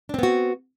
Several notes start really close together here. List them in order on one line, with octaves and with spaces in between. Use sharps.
D4 C4 B3 F#4